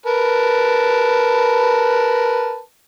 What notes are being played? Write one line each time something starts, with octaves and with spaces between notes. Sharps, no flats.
A#4 B4 A5